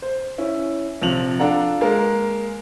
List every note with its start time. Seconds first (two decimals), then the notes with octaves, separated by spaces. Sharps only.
0.02 C5
0.38 C#4 E4
1.02 A#1 C3 F3 F7 F#7
1.39 D4 F4 A4 D5 F#5 A#5
1.81 G#3 A#3 A#4